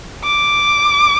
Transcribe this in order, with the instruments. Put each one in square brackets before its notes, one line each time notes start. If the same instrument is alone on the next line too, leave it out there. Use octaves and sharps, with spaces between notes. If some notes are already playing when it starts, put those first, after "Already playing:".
[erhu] D6